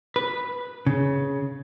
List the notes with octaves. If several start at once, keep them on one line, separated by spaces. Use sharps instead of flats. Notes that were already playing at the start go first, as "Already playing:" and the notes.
B4
C#3